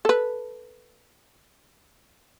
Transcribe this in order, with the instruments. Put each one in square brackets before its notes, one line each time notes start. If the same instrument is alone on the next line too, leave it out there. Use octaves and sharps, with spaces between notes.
[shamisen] A4 B4